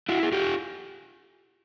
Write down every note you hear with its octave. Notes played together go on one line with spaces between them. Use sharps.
E4 F#4
G#4
F4 G4